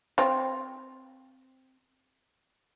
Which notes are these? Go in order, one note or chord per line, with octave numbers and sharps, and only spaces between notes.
C4 F4